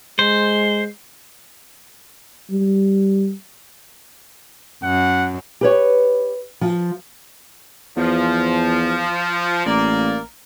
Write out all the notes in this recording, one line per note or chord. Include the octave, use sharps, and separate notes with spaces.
G#3 C5
G3
F#2 F#5
G4 B4 C#5
F3
E2 F3
A1 A#3 D5